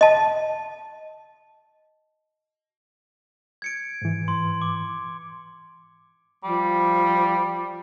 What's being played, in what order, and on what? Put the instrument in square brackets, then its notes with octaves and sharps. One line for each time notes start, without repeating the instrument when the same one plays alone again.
[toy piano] D#5 A5
[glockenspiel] G#6 C#7 D7
[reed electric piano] G#2 E3
[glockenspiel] C6
D6
[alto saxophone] F3 [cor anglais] G3